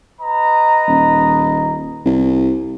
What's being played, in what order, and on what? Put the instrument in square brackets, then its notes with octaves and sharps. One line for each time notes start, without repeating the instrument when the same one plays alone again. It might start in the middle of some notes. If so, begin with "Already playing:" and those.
[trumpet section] B4 D#5 A#5
[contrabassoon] D#1
C2